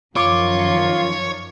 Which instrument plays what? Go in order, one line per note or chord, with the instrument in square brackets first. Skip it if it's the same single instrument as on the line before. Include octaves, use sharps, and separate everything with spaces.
[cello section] F#2 D#3 F3 [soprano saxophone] F4 [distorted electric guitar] C#5 [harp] D6